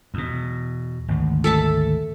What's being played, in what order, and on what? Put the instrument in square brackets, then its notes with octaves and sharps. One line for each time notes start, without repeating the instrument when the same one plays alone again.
[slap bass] E2 B2
G#1 D2
[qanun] A4 E5 A5